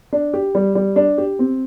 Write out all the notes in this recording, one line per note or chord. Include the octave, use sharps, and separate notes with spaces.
D4
G4
G3
G3
D4
G4
C4